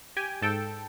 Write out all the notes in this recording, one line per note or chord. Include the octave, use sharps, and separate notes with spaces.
G4 G5 G#5
G#2 A4 G5 A5